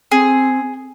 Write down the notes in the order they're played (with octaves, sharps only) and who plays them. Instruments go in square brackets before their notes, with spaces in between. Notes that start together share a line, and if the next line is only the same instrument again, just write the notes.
[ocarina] C4 [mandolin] G#4